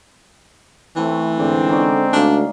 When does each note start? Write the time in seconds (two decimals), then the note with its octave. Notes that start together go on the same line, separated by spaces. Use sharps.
0.96 E3 A3 C4 E4
1.38 G#2 D3 C4 D5
1.69 C#4 D#4 D5
2.13 D2 D4 F5